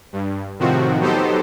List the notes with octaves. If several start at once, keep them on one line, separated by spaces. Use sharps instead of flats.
G2
A2 C3 D#3 F3 C4 F#4
F#3 B3 D#4 G4 A4 C5